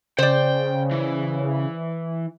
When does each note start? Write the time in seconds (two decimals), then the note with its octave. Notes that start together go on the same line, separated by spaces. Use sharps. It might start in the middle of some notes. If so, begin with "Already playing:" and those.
0.18 C#3 C5 D5 G5
0.91 E3